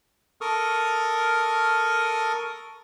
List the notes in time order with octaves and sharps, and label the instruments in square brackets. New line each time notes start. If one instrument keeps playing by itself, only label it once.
[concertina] A4 A#4 C#6 D#6 F6